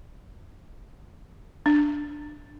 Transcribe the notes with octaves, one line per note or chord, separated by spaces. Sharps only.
D4